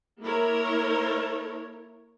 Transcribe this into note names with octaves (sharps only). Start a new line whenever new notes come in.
A#3 E4 A#4 C#5